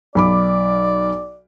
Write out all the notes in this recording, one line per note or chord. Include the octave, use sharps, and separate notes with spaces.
B1 D5 B5 D6